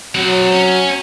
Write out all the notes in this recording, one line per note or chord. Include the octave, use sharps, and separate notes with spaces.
F#3 C4 F#5
C#4